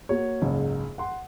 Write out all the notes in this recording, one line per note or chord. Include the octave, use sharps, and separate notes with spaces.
A#3 F#4 C#5
F#1 C#2 G#2
F#5 C6